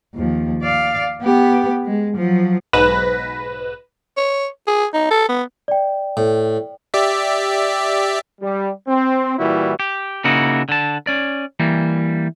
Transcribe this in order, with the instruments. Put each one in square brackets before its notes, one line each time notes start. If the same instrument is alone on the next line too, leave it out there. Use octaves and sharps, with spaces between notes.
[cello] D#2 F3
D5 F5
B3 G4
G#3
F3 F#3
[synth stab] B1 G#2 B4 A#6 E7
[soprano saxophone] C#5
G#4
D#4
A4
B3
[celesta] D5 G5
[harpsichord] A2
[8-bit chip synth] G4 D5 E5
[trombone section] G3
C4
A#2 E3 G3 E4 F#4
[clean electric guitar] G4
C#3 A#3 D#4 E4 F#4
D3 A5
C#4 D5
E3 G3 A#3